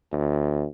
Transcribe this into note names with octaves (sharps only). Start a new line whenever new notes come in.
D2